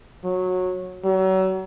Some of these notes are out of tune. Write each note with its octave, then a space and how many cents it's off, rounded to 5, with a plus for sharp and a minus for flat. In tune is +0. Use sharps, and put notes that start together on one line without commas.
F#3 -15
F#3 +35